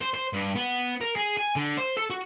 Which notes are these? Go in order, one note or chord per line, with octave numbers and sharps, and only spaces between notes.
C5
C5
G2
B3
A#4
G#4
G#5
D3
C5
A4
F#4